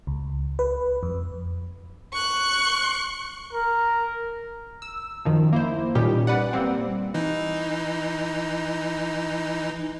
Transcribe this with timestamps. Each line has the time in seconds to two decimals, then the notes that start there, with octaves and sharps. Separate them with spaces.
0.07 C#2
0.59 B4
1.03 F2
2.13 C#6 F#6
3.53 A#4
4.82 E6
5.25 F#2 D#3 F3
5.53 A#3 E4 C5
5.95 A#2 D#3 G3 C#4 G4
6.27 B4 D5 F#5
6.53 G3 A#3 C4
7.14 E3 D#4